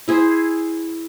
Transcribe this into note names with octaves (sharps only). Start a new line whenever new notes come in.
E4 G#4 C5